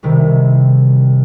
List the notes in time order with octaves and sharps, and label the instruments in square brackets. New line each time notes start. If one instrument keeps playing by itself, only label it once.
[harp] C2 C3 D#3